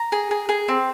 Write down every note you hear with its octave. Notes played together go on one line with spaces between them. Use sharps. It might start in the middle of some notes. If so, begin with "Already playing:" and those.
Already playing: A#5
G#4
G#4
G#4
C4